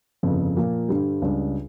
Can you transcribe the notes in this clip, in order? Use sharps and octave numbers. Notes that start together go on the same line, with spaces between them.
G1 F2 C#3
A#2 F3 A#3
G2 D3 G3
C#2 C#3 G3 D4